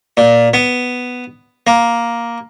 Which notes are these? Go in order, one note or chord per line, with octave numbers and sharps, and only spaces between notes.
A#2
B3
A#3